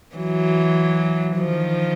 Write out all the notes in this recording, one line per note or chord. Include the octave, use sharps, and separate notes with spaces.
E3 F#3
D#3 F3